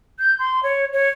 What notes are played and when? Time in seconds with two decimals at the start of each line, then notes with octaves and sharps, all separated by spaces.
0.19 G6
0.39 C6
0.63 C#5
0.93 C#5